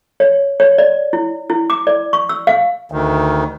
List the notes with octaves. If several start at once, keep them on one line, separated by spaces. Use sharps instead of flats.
C#5
C#5
D5
E4
E4
D6
D5
C#6
E6
F5
D2 D#3